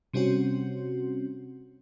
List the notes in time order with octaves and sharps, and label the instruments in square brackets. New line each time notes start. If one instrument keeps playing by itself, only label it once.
[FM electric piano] C3 G3 C4 C#4 F#4